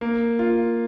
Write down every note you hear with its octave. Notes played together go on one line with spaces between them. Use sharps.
A#3
F4